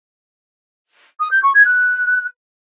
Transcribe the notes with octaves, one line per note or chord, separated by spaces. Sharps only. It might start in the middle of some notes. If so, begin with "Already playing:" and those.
D#6
G6
C#6
G#6
F#6